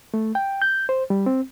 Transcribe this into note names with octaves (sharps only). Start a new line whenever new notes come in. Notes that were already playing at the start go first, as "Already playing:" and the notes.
A3
G5
G6
C5
G3
C4